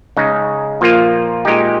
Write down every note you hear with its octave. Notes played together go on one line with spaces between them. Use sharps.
C#3 G#3 D#4
A#2 F3 A#3 F4
A#2 G#3 D#4 G4